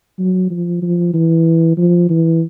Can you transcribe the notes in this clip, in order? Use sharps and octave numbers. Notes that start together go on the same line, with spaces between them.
F#3
F3
F3
E3
F3
E3